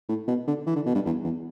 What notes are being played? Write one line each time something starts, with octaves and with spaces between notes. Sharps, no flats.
A2
B2
D3
E3
D3
B2
G2
E2
E2